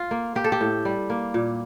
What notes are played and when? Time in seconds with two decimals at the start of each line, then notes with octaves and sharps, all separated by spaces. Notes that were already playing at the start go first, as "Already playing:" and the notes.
Already playing: F4
0.11 A#3
0.35 A#3 G4
0.44 A4
0.52 G4
0.61 A2
0.85 G3
1.10 A#3
1.34 A#2